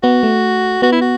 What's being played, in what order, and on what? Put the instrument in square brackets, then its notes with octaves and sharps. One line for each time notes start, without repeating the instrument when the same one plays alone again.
[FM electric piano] B3 [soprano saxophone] F#4
[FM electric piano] A3
[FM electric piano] B3 [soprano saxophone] F#4
[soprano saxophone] E4
F#4